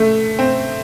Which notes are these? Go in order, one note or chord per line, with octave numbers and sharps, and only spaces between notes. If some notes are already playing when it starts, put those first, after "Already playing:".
Already playing: A3
C4